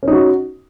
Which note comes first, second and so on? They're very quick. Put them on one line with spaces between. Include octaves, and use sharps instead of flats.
C#4 D#4 F#4